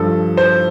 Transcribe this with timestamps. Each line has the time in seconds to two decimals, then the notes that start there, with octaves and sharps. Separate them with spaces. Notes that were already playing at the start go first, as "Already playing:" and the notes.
Already playing: G2 F3 A4
0.37 C5